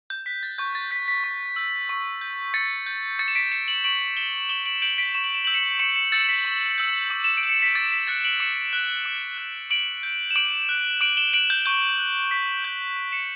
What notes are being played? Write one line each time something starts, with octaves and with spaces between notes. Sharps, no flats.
G6
F#6 B6
A6
C#6 G6
A6
G6 B6
B6
C#6
E6 G6
C#6
G6
C#6 A6 C#7
G6
D6 A6 C#7
E7
B6 D7
G6 C#7 E7
D7 F#7
C#6 D7 F#7
G6 E7 G7
D6 E7 G7
D7 F#7
G6 D7 F#7
B6 D7
C#6 E7
F#7
E7
E6 G6 F#7
C#7 E7
C#6 C#7 E7
C#7 E7
E6 G6 A6 C#7
B6
C#6
E6 G6
D6
E7
D7
G6
C#7
B6
D6 A6
B6
F#6 A6 C#7
D7 F#7
D6 C#7 E7
F#6
D6
F#6
D6 D7 F#7
G6
E7
D6 D7 F#7
F#6
D6 D7 F#7
E7 G7
F#6 D7 F#7
G6
C#6 G6
F#6
D6 B6
G6
C#6
C#7 E7